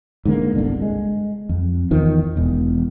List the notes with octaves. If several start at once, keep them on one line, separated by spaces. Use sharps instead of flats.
G#2 D3 A#3
G1 C2 D3
G#3
F2
E2 D#3 F3
E1 E2